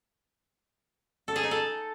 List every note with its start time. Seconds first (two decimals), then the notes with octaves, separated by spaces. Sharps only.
1.28 A4
1.36 G#4
1.43 D#4
1.51 A4